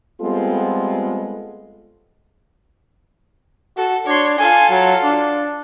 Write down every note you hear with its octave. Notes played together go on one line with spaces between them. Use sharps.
G3 G#3 B3 C4 F4 A4
F#4 A4
D4 C#5 C6
F4 A4 G#5
F#3
D4